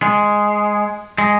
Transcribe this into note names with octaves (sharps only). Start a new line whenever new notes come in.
G#3
G#3